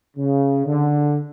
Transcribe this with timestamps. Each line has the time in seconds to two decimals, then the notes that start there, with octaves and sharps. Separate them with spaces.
0.17 C#3
0.66 D3